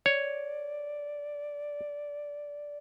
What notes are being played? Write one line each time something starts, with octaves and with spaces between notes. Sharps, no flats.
C#5 D5